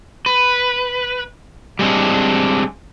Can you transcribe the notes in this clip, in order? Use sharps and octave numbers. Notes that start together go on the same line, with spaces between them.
B4
G3 G#3 C4 D4